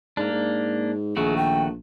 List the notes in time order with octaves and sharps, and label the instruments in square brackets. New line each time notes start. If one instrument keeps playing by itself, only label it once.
[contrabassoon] G#2 [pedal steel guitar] A#3 D4
[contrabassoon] G#2
[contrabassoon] A#1 [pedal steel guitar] D#3 A3 F#4 [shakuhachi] G#4
[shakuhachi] G5